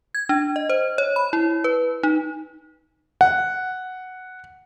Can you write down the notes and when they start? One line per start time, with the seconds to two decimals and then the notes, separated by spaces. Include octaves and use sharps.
0.15 G#6
0.29 D4
0.56 D#5
0.69 C5
0.98 C#5
1.16 B5
1.33 E4
1.64 B4
2.03 D#4
3.21 F#5